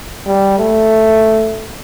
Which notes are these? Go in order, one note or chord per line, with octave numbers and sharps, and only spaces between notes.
G3
A3